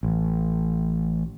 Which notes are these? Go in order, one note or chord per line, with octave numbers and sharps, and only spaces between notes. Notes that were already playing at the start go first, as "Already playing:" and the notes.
A1